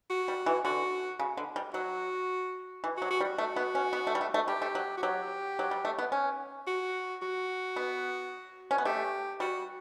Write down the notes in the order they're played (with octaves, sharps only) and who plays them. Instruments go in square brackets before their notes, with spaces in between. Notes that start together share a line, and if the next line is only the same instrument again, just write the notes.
[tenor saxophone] F#4
[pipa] G3
E3
[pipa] D3 [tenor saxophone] F#4
[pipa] C#3
D3
G3
[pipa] F#3 [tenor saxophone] F#4
[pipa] E3
[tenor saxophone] F#4
[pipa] F#3
[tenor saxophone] F#4
[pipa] G3
[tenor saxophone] F#4
[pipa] A3
B3
C#4
B3
A3
G3
A3
A3
[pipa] G3 [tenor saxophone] G4
[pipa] A3
F#3
[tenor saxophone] F#4
[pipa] F#3 [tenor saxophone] G4
[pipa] F#3
G3
A3
B3
C#4
[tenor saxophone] F#4
F#4
[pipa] B3
C#4
B3
[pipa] A3 [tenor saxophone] G4
[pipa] G3 [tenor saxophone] F#4